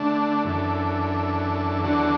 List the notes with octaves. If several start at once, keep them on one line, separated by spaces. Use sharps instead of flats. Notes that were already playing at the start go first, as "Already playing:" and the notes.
Already playing: D3 A3 D4
F#2 E3 D4 A4
E2 D3 F#3 D4 A4